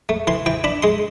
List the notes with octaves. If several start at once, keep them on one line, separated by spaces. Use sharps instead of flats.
A3
E3 C6
E3 G5
D4 B5
G#3 C6